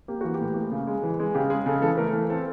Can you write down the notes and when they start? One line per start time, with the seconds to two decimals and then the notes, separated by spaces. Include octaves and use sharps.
0.08 A#3 G4
0.21 E3 F#4
0.34 G4
0.41 A2
0.56 A#3
0.71 C#3
0.87 G#3
1.03 E3
1.20 G#3
1.34 C#3 G4
1.50 G#3 G#4
1.66 C#3 A4
1.82 E3 A4
1.97 A3 A#4
2.13 E3
2.30 C4 A4